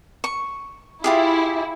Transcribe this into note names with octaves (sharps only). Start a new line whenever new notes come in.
C#6
E4 F4 G4 G#4